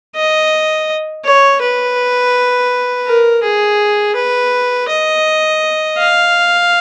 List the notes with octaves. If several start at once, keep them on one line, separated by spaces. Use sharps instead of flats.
D#5
C#5
B4
A#4
G#4
B4
D#5
F5